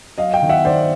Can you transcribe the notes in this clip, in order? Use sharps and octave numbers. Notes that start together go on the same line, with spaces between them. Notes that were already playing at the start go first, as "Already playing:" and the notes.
F#3 D#5 F5
F5 G5
D#3
E5 F#5
D#3 C5 D5